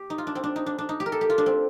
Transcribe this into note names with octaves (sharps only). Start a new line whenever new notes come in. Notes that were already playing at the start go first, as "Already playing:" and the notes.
Already playing: G4
D#4
F4
D4
C4
D4
D#4
D4
D4
D#4
G4
A#4
A4
G4
F4
D4
C4